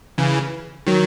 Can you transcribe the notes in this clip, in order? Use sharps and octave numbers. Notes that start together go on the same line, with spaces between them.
C#3 E3
D#3 F#3